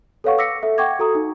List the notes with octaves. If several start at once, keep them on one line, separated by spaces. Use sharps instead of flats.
A4 B4 C#5 F5 F#5 C#6
D6 E6 A#6 B6 C#7
A4 E5
F#5 G5 C#6 D6 G#6
F#4 A4 A#5 D#6
D#4